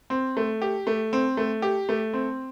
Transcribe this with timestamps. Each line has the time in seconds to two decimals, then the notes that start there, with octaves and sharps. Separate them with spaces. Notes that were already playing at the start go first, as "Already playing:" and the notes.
0.10 C4
0.37 A3
0.62 G4
0.87 A3
1.13 C4
1.37 A3
1.62 G4
1.89 A3
2.13 C4